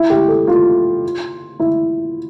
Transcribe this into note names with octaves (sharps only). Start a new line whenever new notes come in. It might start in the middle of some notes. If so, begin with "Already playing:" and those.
Already playing: E4
G4
A4
F4
E4